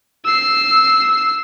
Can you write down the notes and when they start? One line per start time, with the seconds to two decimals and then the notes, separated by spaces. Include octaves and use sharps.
0.24 E6 C7